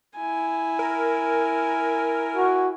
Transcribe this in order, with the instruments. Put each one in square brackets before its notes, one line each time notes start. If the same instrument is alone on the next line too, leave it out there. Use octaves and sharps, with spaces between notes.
[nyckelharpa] E4 G#5
[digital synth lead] A#4
[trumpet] F#4